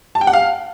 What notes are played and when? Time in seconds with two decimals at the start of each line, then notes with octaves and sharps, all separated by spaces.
0.15 A5
0.21 G5
0.27 F#5
0.33 F5